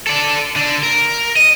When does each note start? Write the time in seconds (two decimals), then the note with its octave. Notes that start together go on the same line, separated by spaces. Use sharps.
0.07 A4 D5
0.56 D3 D4
0.83 A#4
1.37 D#5